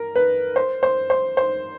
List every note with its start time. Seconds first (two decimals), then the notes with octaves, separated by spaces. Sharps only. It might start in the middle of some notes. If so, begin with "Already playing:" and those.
Already playing: A#4
0.16 B4
0.56 C5
0.83 C5
1.10 C5
1.37 C5